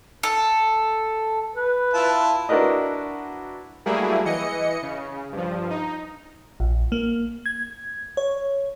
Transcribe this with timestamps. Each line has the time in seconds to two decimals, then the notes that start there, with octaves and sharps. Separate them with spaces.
0.23 A4
1.56 B4
1.94 E4 F4 A5
2.49 D4 E4 F#4 A#4 B4 D#5
3.86 F#3 G3 A3 A#3 E4 G#4
4.25 E3 D#5 C#7
4.82 C#3
5.32 G2 F3
5.70 D#4
6.60 A#1
6.92 A#3
7.46 G#6
8.17 C#5